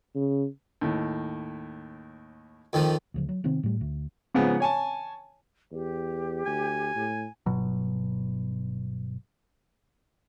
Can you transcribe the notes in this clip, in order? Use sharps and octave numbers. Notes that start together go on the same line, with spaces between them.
C#3
D#2 A2
F2 D#3 F3
D2 C#3 F3
F#3
C3 D#3 B3 C4
A2 G3
D2
G#2 C#3 F3 B3
C#5 G#5 A5
E2 G4
D2 G#5
A2
G1 B2 F#3